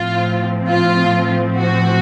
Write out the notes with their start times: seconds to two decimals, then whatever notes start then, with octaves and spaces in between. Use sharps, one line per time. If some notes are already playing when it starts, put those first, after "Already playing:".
Already playing: A2 F3 C4 F4
0.69 F4
1.57 F#4